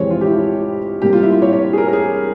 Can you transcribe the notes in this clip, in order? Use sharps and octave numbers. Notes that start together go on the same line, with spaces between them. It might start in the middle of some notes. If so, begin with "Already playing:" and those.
Already playing: F2 C3 E3 G#3 C4 C#5
F4
E4 G4
F4
C3 G3 A#3 G4
F4
E4
F4
C#5
C#5
G#4
A#4
A#4
G#4